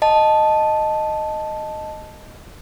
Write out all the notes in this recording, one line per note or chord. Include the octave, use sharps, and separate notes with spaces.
D#5 A5